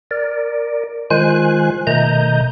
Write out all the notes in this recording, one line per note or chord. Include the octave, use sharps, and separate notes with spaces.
A#4 D5
D#3 G#3 F4 C5 G#5 F#6
B2 D#3 A3 D#5 A#5 G6